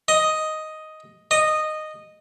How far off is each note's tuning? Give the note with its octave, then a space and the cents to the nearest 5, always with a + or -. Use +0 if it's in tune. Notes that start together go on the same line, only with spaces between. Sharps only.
D#5 +5
D#5 -10